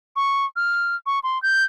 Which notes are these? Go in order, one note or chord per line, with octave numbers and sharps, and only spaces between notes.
C#6
F6
C#6
C6
G6